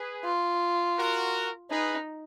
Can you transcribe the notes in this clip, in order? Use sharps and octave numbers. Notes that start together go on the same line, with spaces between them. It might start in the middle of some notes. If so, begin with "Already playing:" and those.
Already playing: G#4 B4
F4
F#4 A#4
D#4 G#4 B4